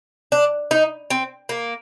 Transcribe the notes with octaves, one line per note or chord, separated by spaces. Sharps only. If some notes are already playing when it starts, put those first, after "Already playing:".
D4
D#4
C4
A#3